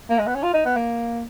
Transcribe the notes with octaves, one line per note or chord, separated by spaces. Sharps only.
A#3
G#3
B3
C#4
F4
D#4
B3
A#3